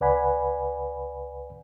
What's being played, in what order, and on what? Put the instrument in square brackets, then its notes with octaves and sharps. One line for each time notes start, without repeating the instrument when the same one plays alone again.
[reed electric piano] C#2 B4 D5 F#5 G#5 B5